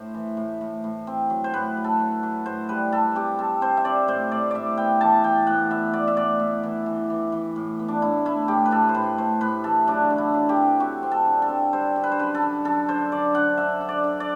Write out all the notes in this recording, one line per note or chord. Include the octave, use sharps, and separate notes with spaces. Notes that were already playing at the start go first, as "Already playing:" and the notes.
Already playing: A2 C5
E3
A2
A2
A2
C4
F#3
C5
A2 B4
F#3
A4
F#3
F#3
A2 C5
G3 B4
G3 A4
C4 G4
C4 A4
C4 C5
E5
C4 D5
A2 C5
A2 D5
A2 D5 E5
B3 G5
E3 A5
E3 G5
A2 F#5
B3 E5
B3 D5
E5
A2 D5
A2
E3
E3
E3
E3
A2
B3
D4
A2 E4
A3 E4
A2 G4
B4
A2 A4
C5
A2 B4
A3 C5
A2 B4
E3 A4
F#3 D4
D3
E4
F#3
G4
C4
C4 F#4
C4
A4
D3
A4
C4
G3 C5
D3
B4
C5
F#2 B4
A4
D3
F#2 A4
D3 C5
D3 D5
D3 F#5
D3 E5
D3
D5
D3
D5